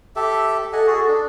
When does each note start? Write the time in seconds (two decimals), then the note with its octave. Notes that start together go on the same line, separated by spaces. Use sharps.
0.16 G4 A4 E5
0.73 A4 D#5 F#5 G#5
0.87 F#4 G#4
1.08 D4